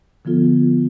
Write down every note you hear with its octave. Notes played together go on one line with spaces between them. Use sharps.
D3 F3 B3 F4 A4